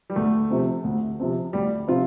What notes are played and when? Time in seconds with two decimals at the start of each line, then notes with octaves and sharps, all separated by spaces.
0.10 G3
0.16 D2 A3
0.50 C3 F3 C4
0.84 D2
1.20 C3 F3 C4
1.53 D2 G3
1.88 C3 F3 C4 F4